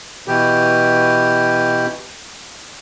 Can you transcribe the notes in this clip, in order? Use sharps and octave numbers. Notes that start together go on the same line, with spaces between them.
B2 E3 G4